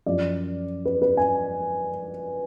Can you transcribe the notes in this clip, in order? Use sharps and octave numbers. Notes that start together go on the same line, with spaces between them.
F#2 F3 D5
B4
B4
G#5